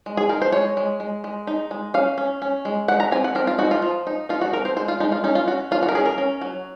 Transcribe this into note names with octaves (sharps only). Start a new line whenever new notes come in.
G#3
G#4
D#4 A#4
C5
G#3 C#5
G#3
G#3
G#3
D#4
G#3
C#4 F5
C#4
C#4
G#3
G#3 F#5
A#5
C4 G#5
F#5
C4 A#4
F4
D#4 F#4
F4
F3
D#4
D#4 F4
F#4
C4 A#4
C5
G#3 C5
F4
G#3 D#4
F4
C#4 D#4
F4
C#4 F#4
C#4 F4
F#4
A#4
C#4 G#4
A#4
C#4
F#3